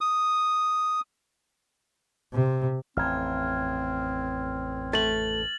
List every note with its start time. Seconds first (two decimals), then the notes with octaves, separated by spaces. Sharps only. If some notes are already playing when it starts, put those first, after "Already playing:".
0.01 D#6
2.33 C3
2.97 A1 F2 C4 F6 G#6
4.93 A3 A6 F#7